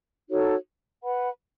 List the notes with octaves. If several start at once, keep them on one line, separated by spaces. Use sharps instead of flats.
D#4 F#4 A4 C#5
B4 F#5 B5